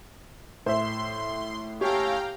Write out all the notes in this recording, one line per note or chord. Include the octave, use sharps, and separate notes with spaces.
A2 C5 E5 C6
C#4 G4 A4 C#5 F5 G5 A#5